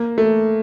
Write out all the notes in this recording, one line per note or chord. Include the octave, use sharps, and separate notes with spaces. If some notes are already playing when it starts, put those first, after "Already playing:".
Already playing: A#3
A3